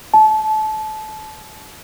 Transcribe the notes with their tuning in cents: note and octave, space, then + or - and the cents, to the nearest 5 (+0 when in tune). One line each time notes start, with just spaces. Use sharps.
A5 -25